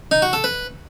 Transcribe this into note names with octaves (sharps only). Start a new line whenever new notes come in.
D#4
F#4
A4
B4